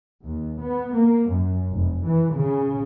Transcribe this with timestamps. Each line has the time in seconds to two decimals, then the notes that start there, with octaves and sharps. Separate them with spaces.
0.25 D#2
0.60 B3
0.94 A#3
1.30 F#2
1.72 F1
2.05 E3
2.34 C#3